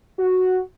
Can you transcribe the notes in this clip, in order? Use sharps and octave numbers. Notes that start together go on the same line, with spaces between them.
F#4